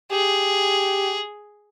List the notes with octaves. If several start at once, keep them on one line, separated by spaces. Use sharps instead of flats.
G4 G#4